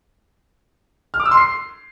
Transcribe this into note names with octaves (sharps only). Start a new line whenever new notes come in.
F6
D6
E6
C6
C7